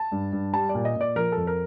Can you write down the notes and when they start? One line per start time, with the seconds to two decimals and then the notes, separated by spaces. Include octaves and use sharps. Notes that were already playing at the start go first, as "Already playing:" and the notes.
Already playing: A5
0.12 G2
0.33 G2
0.54 G3 A5
0.69 D5
0.75 A#2
0.85 D#5
0.96 A#2 D5
1.16 F3 A#4
1.32 F2 A4
1.47 A#4